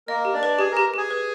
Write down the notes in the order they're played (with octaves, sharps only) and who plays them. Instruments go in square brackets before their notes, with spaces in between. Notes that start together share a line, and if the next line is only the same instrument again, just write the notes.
[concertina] A#3 A#4 [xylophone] D#5
[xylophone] G4
[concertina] D4 D5
[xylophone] B4
[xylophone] G4 [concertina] G#4 G#5
[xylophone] G4 [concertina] A#4 A#5
[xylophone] G4 [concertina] G#4 G#5
[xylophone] B4